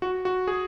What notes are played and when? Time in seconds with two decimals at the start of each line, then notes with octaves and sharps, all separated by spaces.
0.02 F#4
0.25 F#4
0.47 G#4